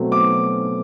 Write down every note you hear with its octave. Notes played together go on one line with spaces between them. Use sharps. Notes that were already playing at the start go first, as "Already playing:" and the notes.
Already playing: B2 F#3 A3 C4
D6